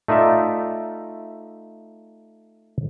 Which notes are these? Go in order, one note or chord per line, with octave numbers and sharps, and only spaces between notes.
A3 D#4 F4 D5 E5